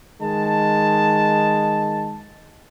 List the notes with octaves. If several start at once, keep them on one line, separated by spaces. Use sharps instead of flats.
D#3 G#3 A5